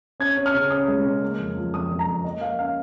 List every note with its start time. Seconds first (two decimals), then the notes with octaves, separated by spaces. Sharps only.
0.20 C#4 G#6
0.37 C#4
0.46 F6
0.54 C#3
0.70 C#4 D#6
0.88 G#3
1.05 C#3
1.22 A#3
1.39 F2
1.56 F3
1.73 F2 D#6
1.90 F2
1.99 A#5
2.07 F2
2.24 A#3 D#5
2.41 A#3 F5
2.59 C#4 F5